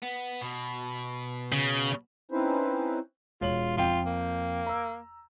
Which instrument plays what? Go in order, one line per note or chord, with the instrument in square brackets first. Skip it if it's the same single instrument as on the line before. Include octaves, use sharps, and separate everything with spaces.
[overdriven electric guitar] B3
B2
[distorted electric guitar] C#3
[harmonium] C4 C#4 D#4 E4 B4 C5
[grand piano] E1 C#5 F#7 [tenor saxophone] F4
[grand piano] F2 G5 [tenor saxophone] F4
[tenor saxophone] A#3
[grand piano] A#5 E6